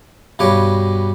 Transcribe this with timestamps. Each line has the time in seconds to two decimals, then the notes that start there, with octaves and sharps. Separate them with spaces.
0.39 G2 B2 G4 C#5 D6